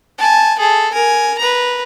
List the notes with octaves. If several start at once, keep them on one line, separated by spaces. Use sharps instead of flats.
G#5 A5
G#4 A4
A#4 G#5
B4 A#5